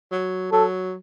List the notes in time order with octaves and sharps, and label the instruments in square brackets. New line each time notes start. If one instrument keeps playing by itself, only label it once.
[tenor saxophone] F#3
[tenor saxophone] F#3 [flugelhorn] A4